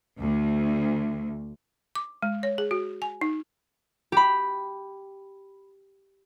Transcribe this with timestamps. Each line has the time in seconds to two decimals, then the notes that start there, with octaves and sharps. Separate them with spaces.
0.21 D2
1.95 D6
2.22 G#3
2.43 C#5
2.58 G#4
2.71 F#4
3.02 G#5
3.21 D#4
4.12 G4 B5